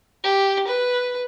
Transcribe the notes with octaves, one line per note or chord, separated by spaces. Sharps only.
G4
B4